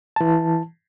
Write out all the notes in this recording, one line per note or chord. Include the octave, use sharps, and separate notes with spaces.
E3 A5